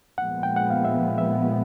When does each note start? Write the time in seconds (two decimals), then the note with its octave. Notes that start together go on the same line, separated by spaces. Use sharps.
0.18 A#2 F3 G#3 B3 F#5
0.43 G5
0.56 F#5
0.70 F5
0.85 E5
1.18 E5